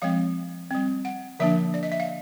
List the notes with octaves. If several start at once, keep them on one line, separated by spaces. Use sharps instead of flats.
F3 G#3 C4 F5
G3 C4
F#5
D3 F3 A#3 D4 E5
D5
D#5
E5
F5